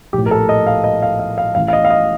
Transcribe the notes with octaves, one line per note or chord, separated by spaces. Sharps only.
A#1 A2 G4
A#4
A4
D#5
F5
D#5
F5
F5
F5
A1 A2 F5
F5
D#5
F5
D#5